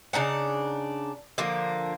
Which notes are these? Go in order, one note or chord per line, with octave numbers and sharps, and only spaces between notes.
C#3 D4 D#4 F#5
D3 F3 A#3